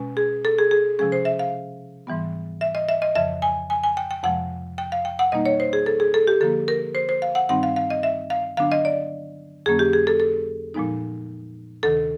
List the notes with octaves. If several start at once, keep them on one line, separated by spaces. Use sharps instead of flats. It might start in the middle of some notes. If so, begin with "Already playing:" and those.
Already playing: B2 G#3 C#4
G#4
A4
G#4
G#4
C3 F3 G#3 C#4 G#4
C5
E5
F5
G#2 E3 G3 B3
E5
D#5
E5
D#5
F2 C#3 F3 E5
G#5
G#5
G#5
G5
G5
F2 C3 F3 G#3 F#5
G5
F5
G5
F#5
B2 G3 A#3 D#4 D#5
C#5
C5
G#4
A4
G#4
A4
G4
D3 F3 A#3 A4
A#4
C5
C5
F5
F#5
G2 D#3 G3 C4 D#4 F#5
F5
F5
D#5
E5
F5
D3 F#3 B3 D4 F5
D#5
D5
F2 D3 F#3 A#3 C#4 G#4
G4
G#4
A4
A4
A#2 F3 G#3 B3 D#4
D2 C3 D#3 A4